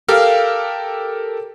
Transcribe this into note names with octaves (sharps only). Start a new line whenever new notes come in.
G4 A4 A#4 F5